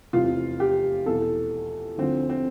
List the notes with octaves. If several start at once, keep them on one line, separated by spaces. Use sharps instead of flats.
F1 E2 C3 F3 F4
G4
E2 B2 A4
D2 D3 F3 C4
C4